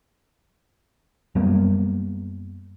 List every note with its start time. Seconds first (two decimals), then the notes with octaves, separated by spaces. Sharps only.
1.35 F#2 G3 A#3 B3